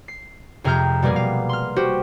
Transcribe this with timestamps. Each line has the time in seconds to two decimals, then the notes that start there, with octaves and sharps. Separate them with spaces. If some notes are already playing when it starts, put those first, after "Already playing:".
0.08 C7
0.64 F2 C3 G#4 A#5 F6 G6
1.02 B2 G3 A#3 B3 G#4
1.16 F5
1.49 C6 F6
1.76 F#4 G4 C5